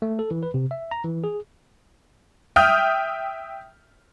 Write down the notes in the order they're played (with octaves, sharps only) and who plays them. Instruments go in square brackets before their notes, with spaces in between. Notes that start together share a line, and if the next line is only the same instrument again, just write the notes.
[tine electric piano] A3
A4
E3
B4
C3
E5
A#5
E3
G#4
[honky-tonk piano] E5 G5 D#6 F6 G6